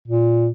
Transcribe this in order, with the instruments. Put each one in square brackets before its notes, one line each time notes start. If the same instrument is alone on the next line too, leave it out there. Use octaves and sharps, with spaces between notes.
[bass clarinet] A#2